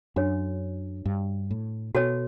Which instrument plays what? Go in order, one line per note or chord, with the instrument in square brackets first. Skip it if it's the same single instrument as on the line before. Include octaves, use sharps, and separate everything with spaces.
[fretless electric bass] F#2 [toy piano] D4 F#4 A4 C#5
[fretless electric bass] G2
A2
[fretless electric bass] B2 [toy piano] F#4 A4 C#5